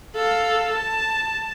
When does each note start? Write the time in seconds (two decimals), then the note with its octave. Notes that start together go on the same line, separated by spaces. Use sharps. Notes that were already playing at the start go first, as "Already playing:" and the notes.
0.16 A4 F5
0.74 A5